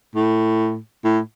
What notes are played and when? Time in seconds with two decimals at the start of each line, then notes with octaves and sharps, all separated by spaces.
0.15 A2
1.04 A2